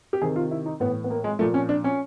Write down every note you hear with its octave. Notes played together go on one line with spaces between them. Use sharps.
G4
C3 D#3 G#4
F4
E4
D#4
A2 E3 B3
B3
A#3
G#3
A#2 F3 A3
C#4
D4
C#4